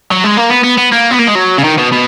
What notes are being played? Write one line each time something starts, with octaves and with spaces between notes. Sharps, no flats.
F#3
G#3
A#3
B3
B3
B3
A#3
B3
A#3
G#3
F#3
C#3
D#3
B2
B2